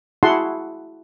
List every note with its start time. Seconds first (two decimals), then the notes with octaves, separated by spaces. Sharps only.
0.23 E4 F#4 G#4 F#5 A5 C6